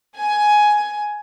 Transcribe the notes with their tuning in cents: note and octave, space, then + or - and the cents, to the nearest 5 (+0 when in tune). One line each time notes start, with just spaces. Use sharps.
G#5 +10